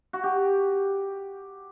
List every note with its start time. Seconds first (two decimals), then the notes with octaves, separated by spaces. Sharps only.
0.13 F#4
0.23 G4